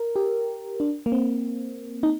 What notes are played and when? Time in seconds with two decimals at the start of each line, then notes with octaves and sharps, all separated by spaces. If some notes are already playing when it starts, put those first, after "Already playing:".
Already playing: A#4
0.16 G4
0.80 D4
1.06 A#3
1.12 C4
2.03 D#4